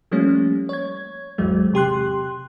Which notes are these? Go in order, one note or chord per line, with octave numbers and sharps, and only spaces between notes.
F3 G3 A3 A#3 C#4
C#5 G#6
G#1 E2 F#3 G#3
C3 G4 C6 F#6